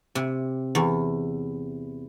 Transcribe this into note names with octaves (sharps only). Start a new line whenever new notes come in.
C3
E2